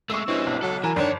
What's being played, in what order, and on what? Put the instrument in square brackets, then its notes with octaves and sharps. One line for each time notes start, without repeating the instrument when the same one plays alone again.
[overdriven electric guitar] G#3 A3 [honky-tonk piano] C#6 E6
[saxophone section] G2 B2 E4 [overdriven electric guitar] C4 C#4
[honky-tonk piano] B1
[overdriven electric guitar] C#2 A4 [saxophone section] F#3
[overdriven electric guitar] E3 [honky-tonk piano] A#4 G#5
[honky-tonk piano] G1 [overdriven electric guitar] F2 C#5 [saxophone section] D#3 D4